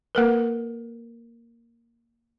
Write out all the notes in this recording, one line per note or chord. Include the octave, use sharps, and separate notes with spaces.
A#3 A#4 B4